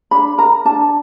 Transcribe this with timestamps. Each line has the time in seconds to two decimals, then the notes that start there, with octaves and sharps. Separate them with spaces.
0.11 D4 B5
0.38 A#4 A#5
0.65 D4 A5